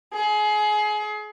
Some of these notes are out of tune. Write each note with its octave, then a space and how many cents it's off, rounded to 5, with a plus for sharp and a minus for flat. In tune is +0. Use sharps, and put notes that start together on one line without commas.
G#4 +25